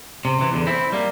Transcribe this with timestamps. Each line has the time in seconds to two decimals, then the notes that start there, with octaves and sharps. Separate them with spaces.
0.25 C3
0.39 C3 E3
0.53 E2 D3
0.67 C4 E4
0.92 G3 A#3